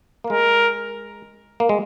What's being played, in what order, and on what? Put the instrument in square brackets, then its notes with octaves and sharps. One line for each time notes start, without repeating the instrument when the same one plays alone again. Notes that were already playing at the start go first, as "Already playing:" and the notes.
[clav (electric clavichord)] A#3
[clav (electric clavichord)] G#3 [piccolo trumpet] A#4
[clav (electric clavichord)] A#3
G#3